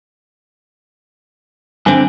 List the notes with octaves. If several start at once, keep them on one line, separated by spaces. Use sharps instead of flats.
G2 D3 C4 G#5